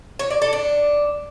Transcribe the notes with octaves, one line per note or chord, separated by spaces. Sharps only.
C#5
D5
A4
D4